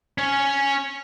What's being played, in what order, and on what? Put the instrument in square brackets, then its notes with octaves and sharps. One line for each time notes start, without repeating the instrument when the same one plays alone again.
[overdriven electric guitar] C#4 C#5